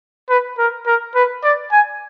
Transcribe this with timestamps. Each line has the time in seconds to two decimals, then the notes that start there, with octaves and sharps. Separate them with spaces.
0.29 B4
0.58 A#4
0.87 A#4
1.15 B4
1.44 D5
1.72 G#5